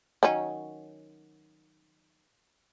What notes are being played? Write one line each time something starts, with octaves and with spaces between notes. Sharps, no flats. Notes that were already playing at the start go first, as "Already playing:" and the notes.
D#3 F#3 C#4